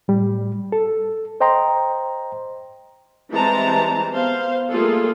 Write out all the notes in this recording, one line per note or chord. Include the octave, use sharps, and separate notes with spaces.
A2 G3
A4
C5 D#5 G5 A#5 C6
E3 G3 G#3 C4 A5 A#5
B3 C5 F5
G3 A3 A#3 F4 G#4 A4